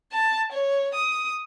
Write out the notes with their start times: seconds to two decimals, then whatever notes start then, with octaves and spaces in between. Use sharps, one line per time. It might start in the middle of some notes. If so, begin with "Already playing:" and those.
0.12 A5
0.52 C#5
0.94 D#6